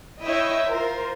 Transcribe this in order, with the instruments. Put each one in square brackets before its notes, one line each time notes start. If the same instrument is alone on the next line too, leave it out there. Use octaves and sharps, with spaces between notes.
[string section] E4 C#5 D#5 E5 G5
F4 A#4 C5